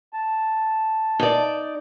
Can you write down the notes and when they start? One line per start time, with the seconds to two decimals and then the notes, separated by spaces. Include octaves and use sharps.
0.13 A5
1.20 D#4 D5